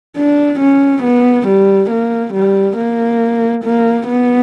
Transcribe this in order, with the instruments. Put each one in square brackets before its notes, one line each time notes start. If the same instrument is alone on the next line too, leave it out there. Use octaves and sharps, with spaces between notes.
[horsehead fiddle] D4
C#4
B3
G3
A#3
G3
A#3
A#3
B3